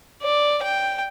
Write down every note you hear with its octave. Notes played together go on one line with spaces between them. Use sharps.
D5
G5